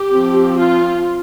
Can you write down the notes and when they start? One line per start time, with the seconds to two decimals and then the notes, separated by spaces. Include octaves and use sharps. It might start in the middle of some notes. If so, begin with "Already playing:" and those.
Already playing: G4
0.10 F3 C4
0.57 F4